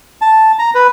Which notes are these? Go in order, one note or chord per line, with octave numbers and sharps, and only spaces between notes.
A5
A#5
B4